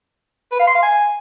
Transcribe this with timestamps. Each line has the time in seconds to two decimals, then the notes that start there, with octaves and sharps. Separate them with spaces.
0.52 B4
0.59 F5
0.67 C6
0.75 F5
0.82 G#5